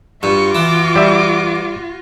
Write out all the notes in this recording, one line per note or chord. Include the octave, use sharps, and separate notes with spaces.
G2 F4 F#4 C#6
E3 D6
G3 E5